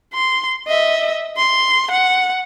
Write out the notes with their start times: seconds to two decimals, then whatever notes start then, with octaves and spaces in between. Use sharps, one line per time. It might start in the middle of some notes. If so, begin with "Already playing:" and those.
0.14 C6
0.68 D#5 E5
1.37 C6
1.91 F#5